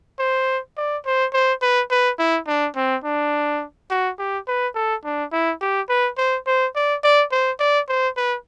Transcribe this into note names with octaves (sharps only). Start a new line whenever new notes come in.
C5
D5
C5
C5
B4
B4
E4
D4
C4
D4
F#4
G4
B4
A4
D4
E4
G4
B4
C5
C5
D5
D5
C5
D5
C5
B4